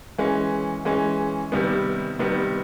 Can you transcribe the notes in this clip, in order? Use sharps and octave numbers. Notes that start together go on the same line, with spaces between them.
E3 G#3 C#4
E3 G#3 C#4
C3 D#3 G3 B3
C3 D#3 G3 B3